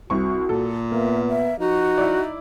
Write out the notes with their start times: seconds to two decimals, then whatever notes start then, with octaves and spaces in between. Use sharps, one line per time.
0.10 C2 C4 F#4 C#6
0.49 A#2 A4
0.92 A#3 B3 E5
1.29 E5
1.60 F3 D#4 F#4
1.98 E4 D5